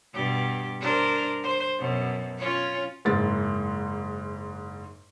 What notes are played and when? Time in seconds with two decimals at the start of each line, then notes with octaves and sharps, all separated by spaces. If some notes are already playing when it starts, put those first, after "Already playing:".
0.14 G2 B2 G4
0.80 D4 A#4 C5
1.43 C5
1.79 F#2 B2
2.38 C#4 F4 C#5
3.05 F#1 G#2 A6